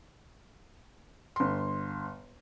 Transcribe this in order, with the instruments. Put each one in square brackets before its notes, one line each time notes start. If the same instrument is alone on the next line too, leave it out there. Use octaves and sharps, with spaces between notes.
[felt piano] G1 C6